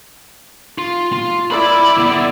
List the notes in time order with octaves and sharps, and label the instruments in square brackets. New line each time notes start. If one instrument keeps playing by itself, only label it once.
[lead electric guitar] F4
F4
[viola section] E4 D5 [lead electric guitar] B5
[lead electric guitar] D3 B3